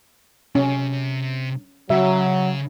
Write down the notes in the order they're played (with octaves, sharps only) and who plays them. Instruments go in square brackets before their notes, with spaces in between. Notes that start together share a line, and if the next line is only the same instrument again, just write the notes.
[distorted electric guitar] C3 [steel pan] C#4
[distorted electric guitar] C#3 [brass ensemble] F#3 [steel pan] E5